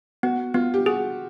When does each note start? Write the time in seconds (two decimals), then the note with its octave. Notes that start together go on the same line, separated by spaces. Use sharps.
0.23 B3 F#4
0.54 B3 F4
0.74 G4
0.86 F#4 G#4